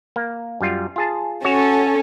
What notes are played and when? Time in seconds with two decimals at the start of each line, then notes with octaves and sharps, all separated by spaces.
0.16 A#3
0.61 F#2 G3 F4
0.96 F4 G#4 A5
1.44 C#4 F#4 A4 C#5